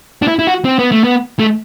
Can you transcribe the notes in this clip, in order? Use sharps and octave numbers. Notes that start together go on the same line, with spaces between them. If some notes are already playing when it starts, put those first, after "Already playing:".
D4
E4
E4
F#4
C4
B3
A3
B3
A3